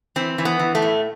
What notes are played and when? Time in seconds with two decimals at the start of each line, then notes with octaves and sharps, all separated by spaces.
0.16 E3 C4
0.38 E3
0.45 B3
0.59 E3
0.75 A3
0.82 A2